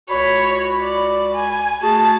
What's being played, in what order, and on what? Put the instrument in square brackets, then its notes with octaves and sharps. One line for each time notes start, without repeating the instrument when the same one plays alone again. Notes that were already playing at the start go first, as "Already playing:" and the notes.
[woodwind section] C#2 F#4 B5 [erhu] C#5
[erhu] D5
G#5
[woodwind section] A3 F#4 G#4 [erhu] A5